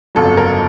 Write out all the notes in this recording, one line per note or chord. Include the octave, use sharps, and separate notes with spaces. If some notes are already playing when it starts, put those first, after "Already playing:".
G1 F2 C#3 F#3 A4
A#4